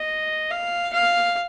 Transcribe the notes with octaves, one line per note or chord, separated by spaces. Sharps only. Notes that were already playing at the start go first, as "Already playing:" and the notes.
Already playing: D#5
F5
F5